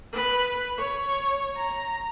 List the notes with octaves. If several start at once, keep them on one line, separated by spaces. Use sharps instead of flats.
B4
C#5
A#5